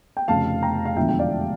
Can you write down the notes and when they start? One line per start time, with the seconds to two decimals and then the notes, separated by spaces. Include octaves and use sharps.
0.17 G5
0.28 F1 F2 C#3 F5 A5
0.62 G5 A#5
0.85 F5
0.96 E1 E2 D3 F3 E5 G5
1.09 G5
1.19 D5 F5